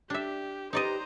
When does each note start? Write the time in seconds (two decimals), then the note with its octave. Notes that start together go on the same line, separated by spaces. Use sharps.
0.10 D4 G4 E5
0.73 D#4 G4 B4 C5 D5 D#5 A#5